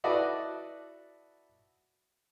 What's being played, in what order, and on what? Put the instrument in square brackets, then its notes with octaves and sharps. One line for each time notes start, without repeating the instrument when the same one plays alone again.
[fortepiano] E4 F#4 A4 B4 D5 D#5